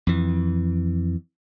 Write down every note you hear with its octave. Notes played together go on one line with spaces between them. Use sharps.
F2 E3